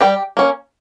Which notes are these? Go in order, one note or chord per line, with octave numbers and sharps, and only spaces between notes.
G3 G4 G5
A#3 C#4